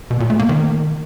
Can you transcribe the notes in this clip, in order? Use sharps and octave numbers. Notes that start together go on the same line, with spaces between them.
B2
A#2
A3
A#3
D#3